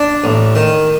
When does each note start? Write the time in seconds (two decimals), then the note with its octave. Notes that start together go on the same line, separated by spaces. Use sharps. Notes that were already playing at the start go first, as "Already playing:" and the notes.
Already playing: D4
0.24 A1
0.55 D#3